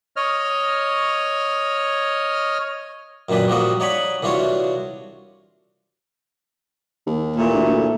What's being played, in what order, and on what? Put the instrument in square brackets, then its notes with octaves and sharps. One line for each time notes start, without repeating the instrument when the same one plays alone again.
[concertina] C#5 D#5 F6
[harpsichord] F#2 A#2 D#3 D4 B4
F3 G3 A#3 F#4 D#5
D#4 C#5 D5 F#5 G#5 B5
C2 E3 D4 F4 F#4 C#5
[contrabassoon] D#2
[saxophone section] A#2 E3 A3
[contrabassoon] D2
D2